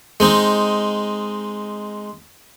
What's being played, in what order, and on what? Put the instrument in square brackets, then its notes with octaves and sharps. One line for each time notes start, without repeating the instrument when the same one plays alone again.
[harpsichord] G#3 C4 D#4